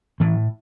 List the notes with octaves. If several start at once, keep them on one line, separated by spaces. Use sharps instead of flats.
A2 E3